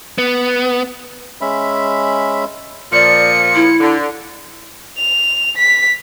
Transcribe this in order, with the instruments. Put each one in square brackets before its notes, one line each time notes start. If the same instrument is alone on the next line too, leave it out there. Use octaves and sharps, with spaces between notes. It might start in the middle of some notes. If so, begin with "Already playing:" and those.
[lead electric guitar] B3
[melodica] G#3 C#4 E5 B5
[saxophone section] A#2 F3 [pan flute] D5 [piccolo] C#7
[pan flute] E4
[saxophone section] D3
[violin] F7
B6